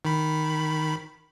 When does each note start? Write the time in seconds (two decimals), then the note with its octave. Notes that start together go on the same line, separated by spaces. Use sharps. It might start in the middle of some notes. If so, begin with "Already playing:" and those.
0.05 D#3 B5